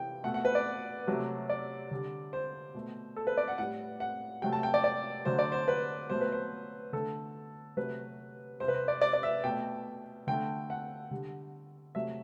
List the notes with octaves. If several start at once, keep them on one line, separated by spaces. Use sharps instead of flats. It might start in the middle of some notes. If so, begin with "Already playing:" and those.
Already playing: C3 E3 G5
B2 A3 F#5
F#5
B4
D5
C3 F#3 A3
D5
D3 G3
C5
B2 A3
A4
B4
D5
F#5
A2 G3 F#5
F#5
C3 F#3 A3 G5
A5
G5
D5
D5
D3 F#3 A3 C5
D5
C5
B4
B2 F#3 A3 C5
B4
C5
D3 A3 A4
C3 F#3 A3 B4
C3 G3 C5
B4
C5
D5
D5
D5
E5
B2 A3 G5
D3 A3 G5
F#5
D3 G3
C3 F#3 A3 E5